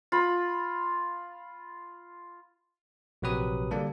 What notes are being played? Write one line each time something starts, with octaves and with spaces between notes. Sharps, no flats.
F4 B5
A#1 C3 F#3 G4 B4 D#6
D3 G3 A#3 D4 A4